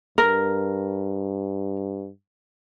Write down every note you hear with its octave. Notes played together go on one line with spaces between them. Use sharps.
G2 A#4